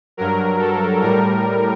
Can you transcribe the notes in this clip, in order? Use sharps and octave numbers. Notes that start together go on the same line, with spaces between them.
G2 F#3 A#4
A4
A2 G3 A#4